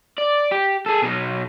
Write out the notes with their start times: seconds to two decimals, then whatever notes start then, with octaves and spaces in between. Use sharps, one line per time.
0.18 D5
0.51 G4
0.86 G#4 A4
1.02 B2 F#3